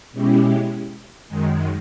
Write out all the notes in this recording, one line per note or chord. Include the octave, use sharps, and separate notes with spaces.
B2 G#3 C#4 E4 G4
F#2 D#3 G#3